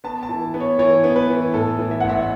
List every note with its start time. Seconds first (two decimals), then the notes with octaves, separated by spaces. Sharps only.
0.04 B3 A5
0.23 A5
0.29 E3
0.54 B3
0.60 C#5
0.79 E3 C#5
1.04 B3
1.16 B4
1.29 E3
1.54 A2 A4
1.79 E3
1.91 E5
2.00 A1 F#5
2.09 E5